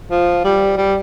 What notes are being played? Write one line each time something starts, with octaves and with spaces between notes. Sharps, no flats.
F3
G3
G3